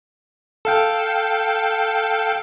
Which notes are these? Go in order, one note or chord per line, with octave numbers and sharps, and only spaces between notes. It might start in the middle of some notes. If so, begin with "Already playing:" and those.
A4 F5 G5